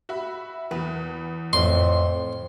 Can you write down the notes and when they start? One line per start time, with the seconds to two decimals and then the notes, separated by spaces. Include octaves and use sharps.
0.09 F#4 E5 B5
0.71 E2 B4
1.53 F2 A2 F3 C6